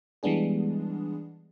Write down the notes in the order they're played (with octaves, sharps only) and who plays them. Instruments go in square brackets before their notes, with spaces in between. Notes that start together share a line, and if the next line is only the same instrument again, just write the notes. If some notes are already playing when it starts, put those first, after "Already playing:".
[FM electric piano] E3 G3 G#3 B3 D4 G#4